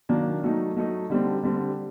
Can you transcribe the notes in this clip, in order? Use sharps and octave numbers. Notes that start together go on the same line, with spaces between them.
D#3 F#3 A#3 D4
F#3 A3 D#4
F#3 A3 D#4
D3 G3 C4
D3 G3 C4